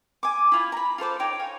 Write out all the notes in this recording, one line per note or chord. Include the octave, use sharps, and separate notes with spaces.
G#5 D6
E4 F4 G#5
A#5 B5
F4 A4 C5 D6
D#4 C#5 G5 D6
C#5 F5 G#5